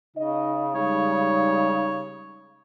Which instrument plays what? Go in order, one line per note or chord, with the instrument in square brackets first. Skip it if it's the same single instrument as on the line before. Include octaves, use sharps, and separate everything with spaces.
[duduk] C#3 [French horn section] D#4 D#5
[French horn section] G3 G#3 D#4 [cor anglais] C#5